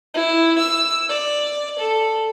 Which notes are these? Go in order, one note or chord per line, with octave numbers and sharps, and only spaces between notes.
E4
E6
D5
A4